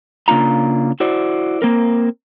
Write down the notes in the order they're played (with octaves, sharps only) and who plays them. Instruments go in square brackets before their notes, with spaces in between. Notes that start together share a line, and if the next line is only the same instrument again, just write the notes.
[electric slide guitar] C#3 A#3 D4 F4 A#5
E4 F#4 C5 D5
A#3 C4 A#4